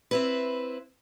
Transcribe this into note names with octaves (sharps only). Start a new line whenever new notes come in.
C4 E4 B4